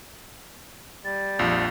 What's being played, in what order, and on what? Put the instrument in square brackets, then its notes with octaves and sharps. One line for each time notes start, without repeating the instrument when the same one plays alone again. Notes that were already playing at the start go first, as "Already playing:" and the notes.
[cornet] G3 [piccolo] A6
[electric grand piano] A#1 [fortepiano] F2